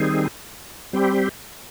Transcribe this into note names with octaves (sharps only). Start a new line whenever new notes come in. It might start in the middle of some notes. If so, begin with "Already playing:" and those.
Already playing: D#3 G3 C4 D#4 G#4
G3 C4 G4